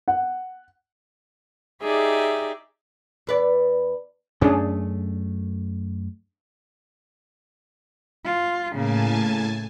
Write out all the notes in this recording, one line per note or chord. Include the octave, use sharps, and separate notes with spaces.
F#5
D#4 G4 G#4 D5 E5
E2 B4 D5
F#2 A3 C#4 D4 G#4
F4
A2 C#3 A#3 G#5 A5